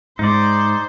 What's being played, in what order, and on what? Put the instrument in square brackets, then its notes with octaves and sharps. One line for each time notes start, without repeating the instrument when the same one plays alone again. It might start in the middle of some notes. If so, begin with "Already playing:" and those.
[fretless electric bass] G#2 [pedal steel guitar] D#4 D5 [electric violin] C5